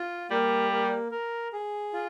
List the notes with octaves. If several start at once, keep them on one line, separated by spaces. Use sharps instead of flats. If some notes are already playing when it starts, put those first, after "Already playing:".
Already playing: F4
G3 A#3
A#3
A#4
G#4
F4